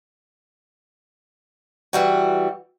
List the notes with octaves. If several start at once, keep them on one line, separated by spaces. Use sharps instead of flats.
E3 G3 F#4